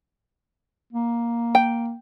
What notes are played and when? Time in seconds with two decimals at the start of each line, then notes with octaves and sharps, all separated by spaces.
0.93 A#3
1.55 G5